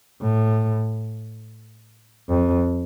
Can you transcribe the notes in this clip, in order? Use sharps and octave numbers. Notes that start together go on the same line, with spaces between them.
A2
F2